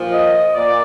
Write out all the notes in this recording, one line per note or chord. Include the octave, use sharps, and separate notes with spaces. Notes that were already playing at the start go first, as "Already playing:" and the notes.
Already playing: A#2 F3
D#5
A#2 D5